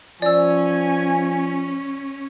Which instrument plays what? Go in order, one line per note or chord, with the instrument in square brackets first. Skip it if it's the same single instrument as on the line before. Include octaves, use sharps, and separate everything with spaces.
[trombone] F3 [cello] C#4 [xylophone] D5 E6 [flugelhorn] G#5